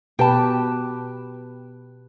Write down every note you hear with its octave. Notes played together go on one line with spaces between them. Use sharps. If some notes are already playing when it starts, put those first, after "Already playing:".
B2 G4 B4 G5 A5